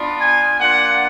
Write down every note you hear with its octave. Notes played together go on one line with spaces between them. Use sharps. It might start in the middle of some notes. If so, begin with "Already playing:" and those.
Already playing: B3 D4 F4
G#5
A#3 D4 F4 F#5